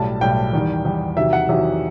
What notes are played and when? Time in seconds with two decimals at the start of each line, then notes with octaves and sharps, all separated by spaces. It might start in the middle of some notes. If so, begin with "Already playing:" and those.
Already playing: B1 A2 G3 A5
0.21 B1 A2 G3 G5
0.53 E2 D#3 G3
0.85 E2 D#3 G3
1.17 E2 C3 D#3 F#3 E5
1.33 F#5
1.49 E2 C3 D#3 F#3 E5